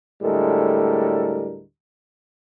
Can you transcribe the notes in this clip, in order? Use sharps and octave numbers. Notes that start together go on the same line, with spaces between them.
D2 A2 G3 G#3 A4 A#4